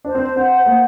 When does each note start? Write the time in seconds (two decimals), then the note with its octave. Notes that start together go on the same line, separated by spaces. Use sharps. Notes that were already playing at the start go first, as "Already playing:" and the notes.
0.04 D4 C5
0.15 C4
0.24 D4
0.36 C4 F#5
0.66 A#3 C5